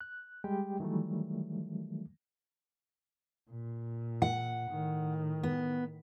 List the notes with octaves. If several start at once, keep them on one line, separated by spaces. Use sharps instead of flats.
F#6
G3 G#3 G4 G5
D#3 E3 F#3 G3 A3
A#2
F#5
A2 D#3
B3